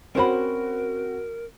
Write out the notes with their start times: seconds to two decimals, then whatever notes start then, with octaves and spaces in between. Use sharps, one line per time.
0.15 C4 C#4 F#4 A#4 C5 B5